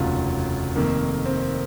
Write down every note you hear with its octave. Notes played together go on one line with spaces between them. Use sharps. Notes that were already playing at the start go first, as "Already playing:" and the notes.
Already playing: F1 D#2 C#3 F#3 F4
F1 F2 D#3 A#3
C4